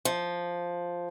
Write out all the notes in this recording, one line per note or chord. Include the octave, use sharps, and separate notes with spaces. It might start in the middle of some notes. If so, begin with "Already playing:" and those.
F3